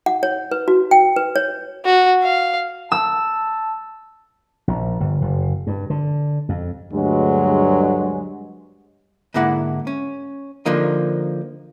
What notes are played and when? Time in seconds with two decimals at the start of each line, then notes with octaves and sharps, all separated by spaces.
0.06 F#5
0.23 C#5
0.51 B4
0.68 F#4
0.91 G5
1.16 B4
1.36 C#5
1.85 F#4
2.23 F5
2.92 A5 E6
4.68 A#1
5.00 G1
5.21 F#1
5.67 G2
5.90 D3
6.49 F2
6.92 D2 G2 F#3 G#3
9.34 G#2 D3 A#3 E4 F#5
9.87 C#4
10.66 D3 F3 A#3 D#4